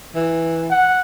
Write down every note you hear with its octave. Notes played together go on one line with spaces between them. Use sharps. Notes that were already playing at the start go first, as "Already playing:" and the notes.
E3
F#5